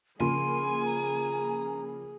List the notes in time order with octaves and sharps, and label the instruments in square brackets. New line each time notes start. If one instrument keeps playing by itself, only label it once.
[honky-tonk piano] C#3 F3 A#3 [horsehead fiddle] G#4 [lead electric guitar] G#5 [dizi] C6
[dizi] A#5